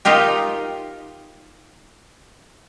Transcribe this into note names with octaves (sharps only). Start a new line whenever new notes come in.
D#4 F4 G4 A#4